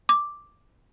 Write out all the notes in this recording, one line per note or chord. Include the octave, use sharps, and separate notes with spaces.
D6